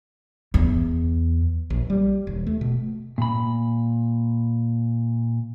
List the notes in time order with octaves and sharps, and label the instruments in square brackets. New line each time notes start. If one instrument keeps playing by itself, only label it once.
[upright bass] E2
[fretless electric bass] A#1
G3
D#1
A3
B2
[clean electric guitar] A#2 B5